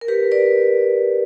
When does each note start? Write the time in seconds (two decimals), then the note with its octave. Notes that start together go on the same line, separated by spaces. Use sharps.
0.01 A#4
0.08 G4 B4
0.32 B4 D5